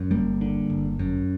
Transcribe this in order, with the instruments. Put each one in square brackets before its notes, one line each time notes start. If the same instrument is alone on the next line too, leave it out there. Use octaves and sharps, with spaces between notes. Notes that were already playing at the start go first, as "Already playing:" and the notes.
Already playing: [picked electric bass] F#2
G1 G3 A#3
D3
G1
F#2